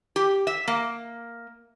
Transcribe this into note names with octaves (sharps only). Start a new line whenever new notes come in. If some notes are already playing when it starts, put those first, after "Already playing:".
G4
E5
A#3